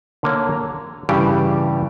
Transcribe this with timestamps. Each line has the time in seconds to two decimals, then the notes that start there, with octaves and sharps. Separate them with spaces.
0.23 D3 A#3 C#5
0.52 A#5
1.09 G2 C#3 E3 G3 G4